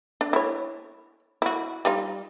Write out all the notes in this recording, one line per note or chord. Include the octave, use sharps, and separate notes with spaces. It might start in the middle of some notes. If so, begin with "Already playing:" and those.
D4
E4 C#5
E4 F#4
G3 D#4 F4